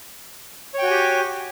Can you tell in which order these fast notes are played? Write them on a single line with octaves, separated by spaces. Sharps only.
C#5 G5 F#4 G#5 G4